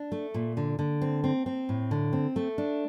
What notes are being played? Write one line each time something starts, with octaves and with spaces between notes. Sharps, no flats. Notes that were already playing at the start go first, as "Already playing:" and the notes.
Already playing: D4
A3
A#2
D3
D3
C4
C4
C4
A2
D3
C4
A3
D4